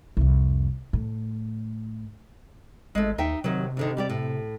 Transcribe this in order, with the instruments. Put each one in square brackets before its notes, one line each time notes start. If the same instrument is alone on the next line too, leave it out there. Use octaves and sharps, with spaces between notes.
[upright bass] C2 F2
A2
[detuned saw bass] G#1 [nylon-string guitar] G#3 A3
[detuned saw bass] D#2 [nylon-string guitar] D#4 E5 G5
[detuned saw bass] C3 [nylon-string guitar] D#3 F#3
[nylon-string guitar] D2 D3 D#3
G3 G4 D5
A2